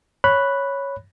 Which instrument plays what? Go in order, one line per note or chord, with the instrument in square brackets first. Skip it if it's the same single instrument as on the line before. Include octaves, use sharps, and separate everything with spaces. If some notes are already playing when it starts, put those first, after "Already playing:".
[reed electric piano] C#5 B5 F#6